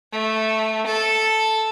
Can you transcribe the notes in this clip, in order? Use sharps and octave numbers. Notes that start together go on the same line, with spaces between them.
A3
A4